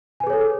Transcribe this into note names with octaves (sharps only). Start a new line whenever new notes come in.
G#4 A4 B4 C#5 G#5